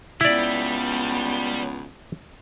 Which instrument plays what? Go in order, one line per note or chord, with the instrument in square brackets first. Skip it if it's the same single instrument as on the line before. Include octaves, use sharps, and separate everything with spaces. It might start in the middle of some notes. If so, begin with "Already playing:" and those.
[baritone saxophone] C#2 [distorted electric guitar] G3 [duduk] B3 [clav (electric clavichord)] E4 D5